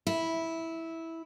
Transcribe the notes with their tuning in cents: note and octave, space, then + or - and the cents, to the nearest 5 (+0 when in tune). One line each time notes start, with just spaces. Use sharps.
E4 -10